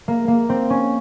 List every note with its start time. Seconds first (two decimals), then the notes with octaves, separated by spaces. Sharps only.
0.08 A#3
0.28 A#3
0.49 C4
0.70 C#4